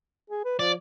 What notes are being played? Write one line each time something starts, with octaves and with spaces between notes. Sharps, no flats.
G#4
B4
F3 D5